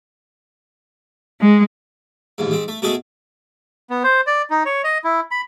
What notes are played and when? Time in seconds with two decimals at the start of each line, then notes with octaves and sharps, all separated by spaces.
1.40 G#3
2.38 A1 D#2 G#2
2.51 G#2 C4
2.68 A3
2.82 B2 G#3 A3 F#4 G#4 A4
3.90 B3
4.04 C5
4.27 D5
4.50 D#4
4.66 C#5
4.84 D#5
5.04 E4
5.31 B5